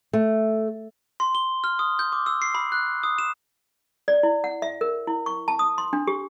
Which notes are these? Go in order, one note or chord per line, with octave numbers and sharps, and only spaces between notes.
A3
C6
G7
F6
D#6
G6
D6
E6
C7
B5
F#6
D#6
E7
D5
E4
F#5
E5
A#4
E4
C#6
A5
D#6
C6
D4
G4